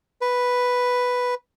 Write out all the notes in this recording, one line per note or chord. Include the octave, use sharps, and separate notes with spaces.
B4